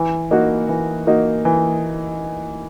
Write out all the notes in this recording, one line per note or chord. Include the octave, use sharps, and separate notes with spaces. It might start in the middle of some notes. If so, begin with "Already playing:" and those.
Already playing: E3
A#3 D#4 F#4
E3
A#3 D#4 F#4
E3